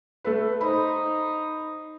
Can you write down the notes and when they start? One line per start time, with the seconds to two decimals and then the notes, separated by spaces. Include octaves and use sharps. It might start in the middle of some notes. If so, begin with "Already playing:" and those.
0.24 A3 A4 B4
0.61 D#4 C5 B5